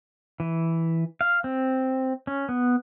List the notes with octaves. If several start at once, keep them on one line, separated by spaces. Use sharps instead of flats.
E3
F5
C4
C#4
B3